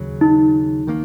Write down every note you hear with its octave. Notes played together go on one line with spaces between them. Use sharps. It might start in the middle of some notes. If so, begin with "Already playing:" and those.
Already playing: D#2 C#3 F#3
D#4
D#3 A#3